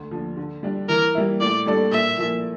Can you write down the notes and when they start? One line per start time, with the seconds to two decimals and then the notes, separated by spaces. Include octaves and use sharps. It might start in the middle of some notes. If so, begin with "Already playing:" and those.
Already playing: D2
0.11 D3 F3
0.37 D3
0.63 G3 D4
0.89 E3 A#4
1.15 G3 A#3 E4
1.41 A2 D5
1.66 G3 D4 A4 D5
1.91 A#2 E5
2.18 F3 A#3 E4